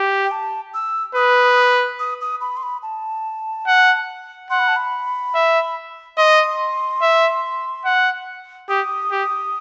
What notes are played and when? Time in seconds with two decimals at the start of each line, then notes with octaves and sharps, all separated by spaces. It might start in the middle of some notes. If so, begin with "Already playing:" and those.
Already playing: G4
0.25 G5
0.31 A5
0.74 E6
1.15 B4 D#6
1.99 D#6
2.21 D#6
2.41 B5
2.57 C6
2.63 B5
2.83 A5
3.67 F#5
4.50 F#5 C6
4.59 B5
4.68 A5
4.76 B5
5.35 E5
6.17 D#5 C6
7.02 E5
7.85 F#5
8.69 G4 D#6
9.11 G4